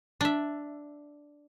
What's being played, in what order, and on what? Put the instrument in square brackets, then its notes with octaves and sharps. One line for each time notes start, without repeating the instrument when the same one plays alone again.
[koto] D4 E5